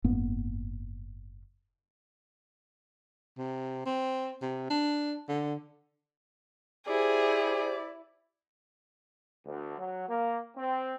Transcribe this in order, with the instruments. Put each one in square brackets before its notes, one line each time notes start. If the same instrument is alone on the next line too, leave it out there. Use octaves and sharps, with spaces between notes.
[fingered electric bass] F#1 G#2 A#3 B3
[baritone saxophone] C3
C4
C3
D4
D3
[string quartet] E4 [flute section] G4 C5 [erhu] G#4 [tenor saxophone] D5
[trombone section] D2
F#3
A#3
C4